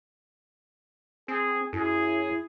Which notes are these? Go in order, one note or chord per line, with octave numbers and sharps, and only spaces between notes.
C4 G#4
F#2 E4 G#4